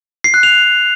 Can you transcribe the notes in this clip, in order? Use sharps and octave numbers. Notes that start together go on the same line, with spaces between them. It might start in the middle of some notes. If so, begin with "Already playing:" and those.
C7
F#6
F7